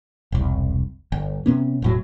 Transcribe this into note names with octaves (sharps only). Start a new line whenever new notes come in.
E1 C2
G1
C3 B3 C#4
E1 A2 F#3